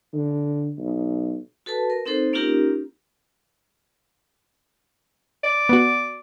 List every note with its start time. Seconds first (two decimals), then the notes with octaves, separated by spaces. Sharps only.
0.13 D3
0.78 B1
1.66 F#4 A4 B4 A5
1.90 A#4
2.06 C4 D#4 A4 C5
2.33 A#3 C#4 D#4 F4 G4 A#4
5.44 D5
5.69 B3 F#4